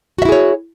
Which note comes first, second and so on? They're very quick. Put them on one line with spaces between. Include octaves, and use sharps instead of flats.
F#4 E5 E4 G#4 C#5